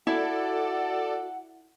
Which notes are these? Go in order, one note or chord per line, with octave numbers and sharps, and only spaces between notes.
E4 F#4 A4 D5 F#5